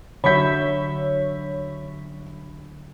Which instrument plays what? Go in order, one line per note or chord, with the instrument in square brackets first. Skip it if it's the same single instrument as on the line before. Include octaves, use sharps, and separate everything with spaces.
[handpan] D3 F#3 E5 [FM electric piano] C#5 C#6 B6 [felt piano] B5 G6